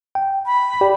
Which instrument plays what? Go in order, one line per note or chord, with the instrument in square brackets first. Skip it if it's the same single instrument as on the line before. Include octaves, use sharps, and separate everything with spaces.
[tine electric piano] G5
[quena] B5
[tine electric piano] G4 D5 G5